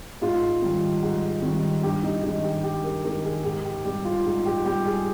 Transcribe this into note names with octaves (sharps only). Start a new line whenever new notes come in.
G#2 F4
D#3 G3
G#2
D#3 G3
G2 G4
D#4
D#3 G#3 D#4
G4
G2 G4
A#4
D#3 G#3 A#4
G#4
G#2 G4
G4
G3 G4
F4
G#2
G4
G3 G4
G#4